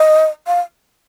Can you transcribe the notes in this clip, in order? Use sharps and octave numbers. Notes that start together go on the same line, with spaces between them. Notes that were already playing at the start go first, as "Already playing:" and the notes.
Already playing: D#5
F5